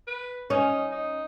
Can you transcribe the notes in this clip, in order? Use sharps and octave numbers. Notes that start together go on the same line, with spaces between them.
B4
C#4 D#4
D#4